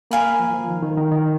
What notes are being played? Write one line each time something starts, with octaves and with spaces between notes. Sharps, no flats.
A#3 A#4 F5 G#5 B5
F3
F3
D#3
D#3
D#3
D#3